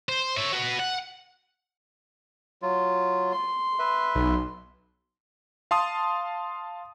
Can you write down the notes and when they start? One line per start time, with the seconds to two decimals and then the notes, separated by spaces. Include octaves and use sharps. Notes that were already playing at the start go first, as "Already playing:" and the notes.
0.09 C5
0.37 C#5 E5
0.53 F#4 B4
0.79 F#5
2.62 F#3 F4
3.33 C6
3.79 B4 E5
4.15 B1
5.71 F5 A5 C6 D#6